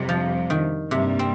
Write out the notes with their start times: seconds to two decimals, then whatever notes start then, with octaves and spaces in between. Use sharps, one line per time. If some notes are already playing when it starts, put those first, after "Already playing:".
Already playing: F2 C3 G3
0.09 F3
0.50 D#3
0.91 G2 C3 G3 A#3
1.19 C4